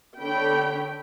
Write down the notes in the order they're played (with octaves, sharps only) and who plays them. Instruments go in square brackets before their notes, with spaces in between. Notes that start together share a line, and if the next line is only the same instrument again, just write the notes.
[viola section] D3 C#5 G5 B5